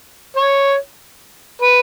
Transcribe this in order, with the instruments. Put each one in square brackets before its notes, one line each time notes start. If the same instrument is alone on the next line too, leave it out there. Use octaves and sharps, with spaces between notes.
[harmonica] C#5
B4